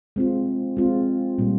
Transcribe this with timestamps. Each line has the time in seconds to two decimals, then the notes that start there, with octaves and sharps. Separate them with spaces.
0.16 G#3 C4 F4
0.77 G#3 C4 F4
1.38 A#2 G3 A#3